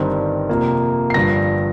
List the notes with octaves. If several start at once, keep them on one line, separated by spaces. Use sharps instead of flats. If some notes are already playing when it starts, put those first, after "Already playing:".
Already playing: G1 G2 D#3 G3 C4
F2 C3 F3 A#3
C7
G1 G2 F3 A#6